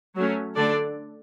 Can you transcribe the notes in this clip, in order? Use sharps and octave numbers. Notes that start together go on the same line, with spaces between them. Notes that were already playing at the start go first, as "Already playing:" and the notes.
F#3 A3 C#4
D3 A3 D4 A4 D5